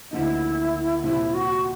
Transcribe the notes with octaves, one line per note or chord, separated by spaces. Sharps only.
D2 D3 F3 A#3 D#4 E4
C2 A#2 F3 E4
F#4